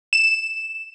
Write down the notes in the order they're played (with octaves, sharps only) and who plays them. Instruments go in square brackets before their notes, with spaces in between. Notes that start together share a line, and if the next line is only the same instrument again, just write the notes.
[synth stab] E7